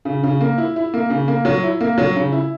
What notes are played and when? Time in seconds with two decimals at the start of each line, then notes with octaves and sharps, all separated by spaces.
0.05 C#3
0.23 C#3
0.41 A#3
0.58 E4
0.76 E4
0.94 A#3
1.10 C#3
1.28 A#3
1.45 F#3
1.63 E4
1.81 A#3
1.98 F#3
2.16 C#3
2.32 E4